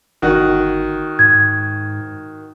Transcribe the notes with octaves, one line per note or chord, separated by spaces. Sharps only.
G1 D#3 F#4
G#2 G#6